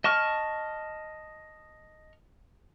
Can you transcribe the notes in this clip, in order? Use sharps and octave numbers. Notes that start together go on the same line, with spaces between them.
D#5 A5 C#6 F6